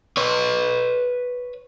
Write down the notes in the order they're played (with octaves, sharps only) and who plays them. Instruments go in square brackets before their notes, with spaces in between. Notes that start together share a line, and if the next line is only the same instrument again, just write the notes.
[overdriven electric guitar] B4 C#5